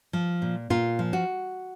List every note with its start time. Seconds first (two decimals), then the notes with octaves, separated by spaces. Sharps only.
0.13 F3
0.42 A#2
0.70 A#2 F4
0.99 F3
1.13 F#4